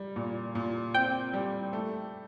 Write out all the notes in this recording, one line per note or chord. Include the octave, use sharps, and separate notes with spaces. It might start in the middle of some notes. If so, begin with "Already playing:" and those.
Already playing: G3
A#2
A#2
C4 G5
G3
A3